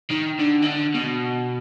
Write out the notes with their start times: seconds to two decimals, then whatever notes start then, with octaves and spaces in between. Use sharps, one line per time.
0.11 D#3
0.39 D3
0.62 D#3
0.67 D3
0.95 B2